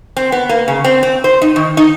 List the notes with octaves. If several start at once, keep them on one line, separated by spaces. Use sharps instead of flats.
C4
B3
A#3
C#3
C4
C4
C5
D#4
D#3
D#4